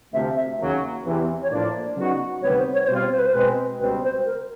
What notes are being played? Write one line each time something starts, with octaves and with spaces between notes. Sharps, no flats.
D2 C3 F3 E5
E5
D#2 C#3 F#3 A#3
E2 C3 E3
C#5
A2 F3 A#3 D4 D5
C#3 F#3 B3 D#4 F#4
D2 C3 D#3 G3 B3 C#5
C5
C#5
C#5
B2 G3 C4 F4 C5
C5
B4
C5
B2 G#3 C4 B4
C#2 B2 G3 C4 B4
C5
A#4